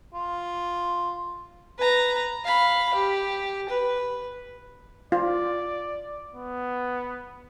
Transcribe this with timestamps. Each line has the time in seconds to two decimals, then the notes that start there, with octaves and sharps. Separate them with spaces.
0.14 F4
1.78 B4 A#5
2.44 F5 B5
2.94 G4
3.68 B4
5.12 F4 D5
6.35 B3